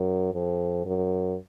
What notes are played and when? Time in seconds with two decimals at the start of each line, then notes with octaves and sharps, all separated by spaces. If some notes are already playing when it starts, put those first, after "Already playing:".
Already playing: F#2
0.33 F2
0.86 F#2